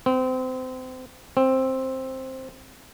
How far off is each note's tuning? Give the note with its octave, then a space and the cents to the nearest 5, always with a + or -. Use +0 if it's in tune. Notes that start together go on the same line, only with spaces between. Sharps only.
C4 -30
C4 +5